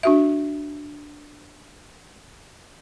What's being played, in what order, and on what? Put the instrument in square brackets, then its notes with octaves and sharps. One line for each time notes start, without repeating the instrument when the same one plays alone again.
[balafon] D4 F#4 E5